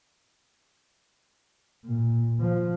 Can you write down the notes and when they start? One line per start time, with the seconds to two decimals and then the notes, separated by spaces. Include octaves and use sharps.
1.85 A#2
2.40 F3